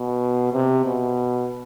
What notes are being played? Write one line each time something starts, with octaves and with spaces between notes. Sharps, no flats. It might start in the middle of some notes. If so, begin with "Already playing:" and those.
Already playing: B2
C3
B2